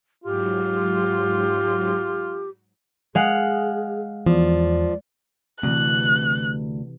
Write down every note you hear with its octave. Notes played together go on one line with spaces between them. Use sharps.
G#2 F#3 F4 G4
G#3 G#4 F5 F#5
E2 F3 D5
D2 C3 E3 F#6